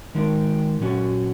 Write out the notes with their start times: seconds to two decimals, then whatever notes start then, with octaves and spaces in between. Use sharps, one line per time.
0.15 D#3 G#3 D#4 A#4
0.80 A#2 F#3 C#4 F#4